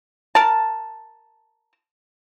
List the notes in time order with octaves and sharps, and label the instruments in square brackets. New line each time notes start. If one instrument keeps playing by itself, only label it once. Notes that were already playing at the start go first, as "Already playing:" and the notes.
[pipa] A#4 A5